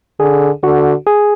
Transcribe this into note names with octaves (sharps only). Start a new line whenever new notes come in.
D3 G#4
D3 F#4
G#4